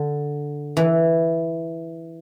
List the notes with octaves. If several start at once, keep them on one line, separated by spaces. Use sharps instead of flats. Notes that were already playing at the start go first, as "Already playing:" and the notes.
Already playing: D3
E3